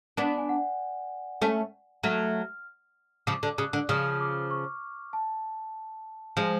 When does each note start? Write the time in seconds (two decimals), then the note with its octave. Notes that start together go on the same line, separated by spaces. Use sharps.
0.17 B3 D4 D5
0.38 G#5
0.49 F#5
1.42 A3 C#4
2.03 F#3 A3 F6
3.27 C#3 F3 D6
3.43 D3
3.58 C#3 F#6
3.73 D3
3.89 C#3 F3 F6
4.20 D6
4.51 C#6
5.13 A5
6.37 F3 G#3